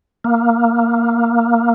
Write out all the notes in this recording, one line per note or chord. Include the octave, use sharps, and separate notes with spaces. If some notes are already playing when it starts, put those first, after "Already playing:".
A#3